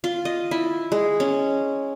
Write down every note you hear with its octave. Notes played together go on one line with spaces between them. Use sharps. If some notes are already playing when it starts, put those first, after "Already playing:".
F4
D#5
E4
G#3
C#4